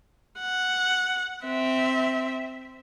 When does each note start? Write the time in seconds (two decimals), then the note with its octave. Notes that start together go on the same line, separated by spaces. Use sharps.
0.40 F#5
1.46 C4 E5